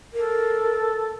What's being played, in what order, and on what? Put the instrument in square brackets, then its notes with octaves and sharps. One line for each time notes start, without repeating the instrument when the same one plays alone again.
[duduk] A4 [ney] A#4